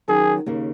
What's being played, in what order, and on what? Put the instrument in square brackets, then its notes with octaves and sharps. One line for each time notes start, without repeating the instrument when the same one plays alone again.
[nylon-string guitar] D#3 F#3 C#4 [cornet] G#4
[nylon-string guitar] D#2 C#3 A#3